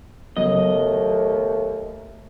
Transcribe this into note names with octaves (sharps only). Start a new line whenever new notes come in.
D#2 C#3 F#3 A3 B3 D#5